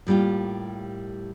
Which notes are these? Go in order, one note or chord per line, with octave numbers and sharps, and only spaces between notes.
A2 G3 A#3 F4 G4